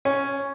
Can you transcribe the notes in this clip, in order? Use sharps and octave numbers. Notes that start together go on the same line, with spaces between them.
C#4